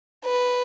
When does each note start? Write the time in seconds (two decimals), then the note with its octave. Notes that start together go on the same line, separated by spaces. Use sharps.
0.25 B4